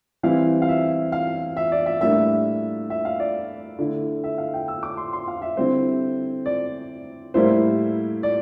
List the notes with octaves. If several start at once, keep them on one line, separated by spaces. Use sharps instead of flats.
E3 G3 C4 E4 F5
F5
E5
F5
E5
D5
E5
A2 G3 A#3 D4 E5
E5
F5
D5
D3 A3 E4
E5
F5
G5
E6
D6
C6
C6
F5
E5
D3 G3 C4 E4 C5
D5
A2 G3 A#3 E4 C5
D5